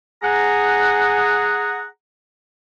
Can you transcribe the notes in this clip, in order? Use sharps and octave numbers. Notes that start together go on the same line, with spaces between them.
G#4 F#5 A#5